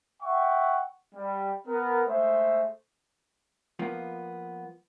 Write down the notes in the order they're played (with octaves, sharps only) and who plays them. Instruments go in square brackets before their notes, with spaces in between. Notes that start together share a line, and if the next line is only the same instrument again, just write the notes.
[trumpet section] E5 F#5 G5 C#6
G3
B3 A#4
G#3 A3 C5 E5
[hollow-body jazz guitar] F3 A#3 B3